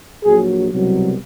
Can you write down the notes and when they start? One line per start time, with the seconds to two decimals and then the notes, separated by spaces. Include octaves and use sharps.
0.24 A#1 A#2 F#3 G#4
0.70 C2 B2 F#3